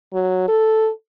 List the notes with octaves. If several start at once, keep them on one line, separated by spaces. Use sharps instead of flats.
F#3
A4